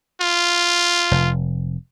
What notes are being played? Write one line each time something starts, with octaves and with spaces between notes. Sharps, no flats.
F4
F1